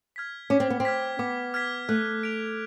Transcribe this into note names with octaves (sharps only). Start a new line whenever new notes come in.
F6 G#6 B6
C#4 D6
C4
B3
C4
F6 G#6 B6
B3 D6
F6 G#6 B6
A3 F#6
B6 D7 F7